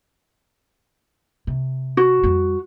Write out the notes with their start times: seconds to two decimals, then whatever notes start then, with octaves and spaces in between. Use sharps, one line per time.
1.47 C3
1.97 F#4
2.23 F2 G3